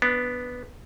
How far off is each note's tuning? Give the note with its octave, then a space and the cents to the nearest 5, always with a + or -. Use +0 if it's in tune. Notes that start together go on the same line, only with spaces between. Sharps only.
B3 +0 D4 +0